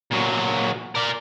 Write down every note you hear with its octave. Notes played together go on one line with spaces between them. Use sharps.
A#2 F#3
A#4 D5